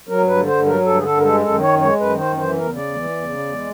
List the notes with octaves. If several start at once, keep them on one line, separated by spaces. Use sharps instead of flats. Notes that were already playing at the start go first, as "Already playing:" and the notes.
F#3 A#4
G2 B4
D3
G2 C5
F#3 A#4
G2 A4
D3 G#4
G2 A4
A#4
G#3 A4
F#2 A4
D#3
F#2 C#5
G#3 C#5
F#2
B4
D#3
F#2 C5
E3 C5
E2 A#4
C#3
E2 D5
E3
E2
C#3
E2
G#3